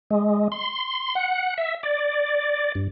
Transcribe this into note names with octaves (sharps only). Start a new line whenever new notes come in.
G#3
C6
F#5
E5
D5
G2